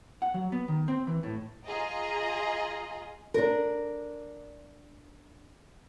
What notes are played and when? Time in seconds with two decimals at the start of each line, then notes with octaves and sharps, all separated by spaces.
0.22 F#5
0.34 F#3
0.52 B3
0.68 D#3
0.88 C4
1.07 E3
1.23 A2
1.65 F4 G#4 D#5 A#5
3.34 D4 A#4